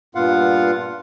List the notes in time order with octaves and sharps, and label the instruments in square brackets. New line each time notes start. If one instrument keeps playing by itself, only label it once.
[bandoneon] G2 A#2 B3 F4 F5 F#5